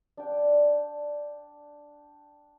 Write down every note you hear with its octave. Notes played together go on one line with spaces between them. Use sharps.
D4 G5